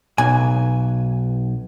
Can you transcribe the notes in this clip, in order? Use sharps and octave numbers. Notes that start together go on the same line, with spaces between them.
B1 G#5